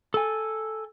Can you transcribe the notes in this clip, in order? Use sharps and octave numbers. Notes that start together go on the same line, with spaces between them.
A4 G#5